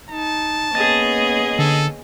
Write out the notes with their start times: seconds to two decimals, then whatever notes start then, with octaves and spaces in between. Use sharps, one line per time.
0.11 D#4 A5
0.75 A#3 B3 C#4 G#4 D#5 A6
1.59 D3 A4